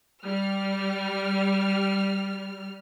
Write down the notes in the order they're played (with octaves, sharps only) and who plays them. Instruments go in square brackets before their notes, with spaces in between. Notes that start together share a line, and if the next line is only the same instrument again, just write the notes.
[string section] G3 F6